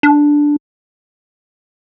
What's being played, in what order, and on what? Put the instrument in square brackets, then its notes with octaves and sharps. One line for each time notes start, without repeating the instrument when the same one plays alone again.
[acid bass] D4